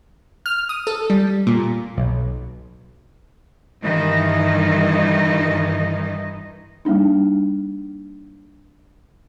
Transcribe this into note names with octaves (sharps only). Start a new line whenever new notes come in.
F6
D#6
A4
G3
A#2
B1
G2 D#3 E3 D#4 D#5
G3 A#3 D4 D#4